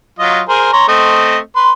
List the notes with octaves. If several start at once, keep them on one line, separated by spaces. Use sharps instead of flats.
F#3 F4 D#5
G#4 A#4 C5
C#5 A#5 C6
A3 C4 D#5
B4 C6